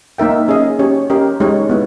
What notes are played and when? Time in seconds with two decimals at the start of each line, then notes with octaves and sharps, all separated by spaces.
0.18 A#3 D#4 A#4 E5 G5
0.48 C#4 G#4 D#5
0.79 C#4 G4 C#5
1.10 C#4 G4 A#4 D#5
1.40 G#3 D#4 G4 C#5
1.70 B3 E4